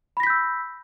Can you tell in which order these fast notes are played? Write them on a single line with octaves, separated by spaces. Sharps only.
B5 A#6 B6 G6 E6